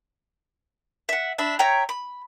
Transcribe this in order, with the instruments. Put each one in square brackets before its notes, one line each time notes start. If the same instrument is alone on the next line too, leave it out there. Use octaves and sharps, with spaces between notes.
[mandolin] E5 F#5
D4 E5 B5
C#5 E5 G5 A#5
B5